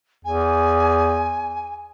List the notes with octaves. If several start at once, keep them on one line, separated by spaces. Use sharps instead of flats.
E2 G#5